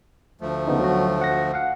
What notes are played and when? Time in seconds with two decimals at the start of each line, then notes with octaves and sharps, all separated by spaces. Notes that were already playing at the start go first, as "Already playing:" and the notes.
0.41 D2 F3 A3
0.67 C#3 B3 D#4
0.79 F#3 F#4
1.21 F#5 A#6
1.54 F5 F#5